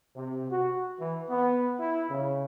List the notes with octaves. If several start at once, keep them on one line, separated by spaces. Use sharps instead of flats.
C3
F#4
E3
B3
E4
C#3